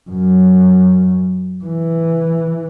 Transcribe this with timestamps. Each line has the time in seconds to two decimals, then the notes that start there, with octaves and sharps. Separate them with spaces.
0.10 F#2
1.65 E3